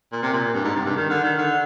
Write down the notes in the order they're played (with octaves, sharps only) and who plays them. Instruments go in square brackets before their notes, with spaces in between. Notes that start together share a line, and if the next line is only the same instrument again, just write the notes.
[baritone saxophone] A#2
C3
A#2
G2
G#2
C3
G2
D#3
D3
D#3
D3